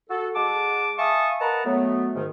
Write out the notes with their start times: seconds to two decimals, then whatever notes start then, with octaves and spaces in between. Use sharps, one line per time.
0.10 F#4 A4
0.35 G#3 F#5 A5 D6
0.99 E5 F5 G#5 A5 C#6 D#6
1.40 A#4 B4 D#5 F#5 A5 A#5
1.65 F#3 A3 B3
2.15 G#2 D#3